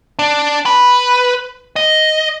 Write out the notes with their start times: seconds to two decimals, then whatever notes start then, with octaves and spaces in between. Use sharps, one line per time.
0.19 D4
0.66 B4
1.76 D#5